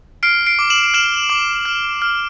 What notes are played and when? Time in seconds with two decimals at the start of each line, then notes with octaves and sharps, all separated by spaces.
0.23 F6 C7 D7
0.46 C7 D7
0.59 D6
0.70 E7 F#7
0.94 F6 E7 F#7
1.30 D6
1.65 F6
2.02 F6